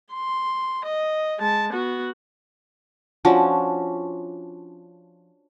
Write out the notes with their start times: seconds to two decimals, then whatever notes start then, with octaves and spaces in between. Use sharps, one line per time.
0.13 C6
0.86 D#5
1.39 G#3 A5
1.72 B3 F#4
3.25 F3 C#4 D4 F#4